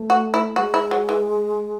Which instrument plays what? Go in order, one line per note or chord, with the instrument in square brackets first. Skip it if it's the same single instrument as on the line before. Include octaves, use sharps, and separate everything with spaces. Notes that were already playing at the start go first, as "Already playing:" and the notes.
Already playing: [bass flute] A3
[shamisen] F#4
E4
[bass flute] G#3 [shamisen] F#4
[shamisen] E4
F#3
E3